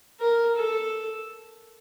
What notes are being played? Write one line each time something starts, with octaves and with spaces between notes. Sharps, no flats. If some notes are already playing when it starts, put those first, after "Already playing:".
A#4
A4